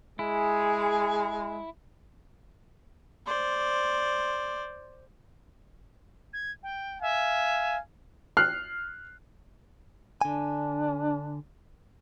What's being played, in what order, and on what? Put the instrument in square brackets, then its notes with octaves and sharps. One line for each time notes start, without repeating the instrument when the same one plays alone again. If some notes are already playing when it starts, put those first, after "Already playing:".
[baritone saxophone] G#3 [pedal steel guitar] E4 [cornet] G#4
[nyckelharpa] C5 D5
[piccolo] G#6
G5
[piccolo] E5 [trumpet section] F5 G#5
[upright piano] F6 F#6 C7
[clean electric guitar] D3 G#5 [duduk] D4